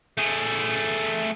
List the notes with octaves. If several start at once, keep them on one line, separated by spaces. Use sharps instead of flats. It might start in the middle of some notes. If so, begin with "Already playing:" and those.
A3 G#4